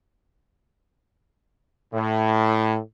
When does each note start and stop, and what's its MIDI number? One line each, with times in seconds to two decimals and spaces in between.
1.93 2.78 45